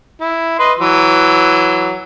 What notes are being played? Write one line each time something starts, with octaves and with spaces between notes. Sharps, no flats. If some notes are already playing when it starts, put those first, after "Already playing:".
E4
B4 D#5 C6
E3 F#3